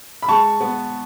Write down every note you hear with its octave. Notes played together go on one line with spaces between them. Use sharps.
B5
G#3 A5 C#6
B3